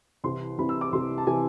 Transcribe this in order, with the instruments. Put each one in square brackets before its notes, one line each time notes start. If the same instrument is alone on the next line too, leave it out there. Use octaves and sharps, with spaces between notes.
[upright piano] C2 C3 E3 C6
C2 C3 E3 B5
E6
D6
C2 C3 E3 C6
A5
C3 E3 G#5